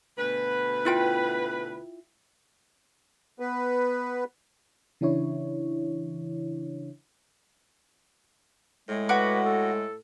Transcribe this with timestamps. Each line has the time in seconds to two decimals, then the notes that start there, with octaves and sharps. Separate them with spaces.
0.18 D2 B2 B4
0.85 E4 F4 G5
3.40 B3 B4
5.01 C#3 E3 D4 E4 C#5
8.89 A2 G#3
9.09 F#4 B4 D6
9.46 A4